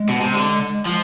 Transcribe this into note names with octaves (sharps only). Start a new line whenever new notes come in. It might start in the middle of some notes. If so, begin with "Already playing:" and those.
Already playing: G#3
B2
C3
D3
F3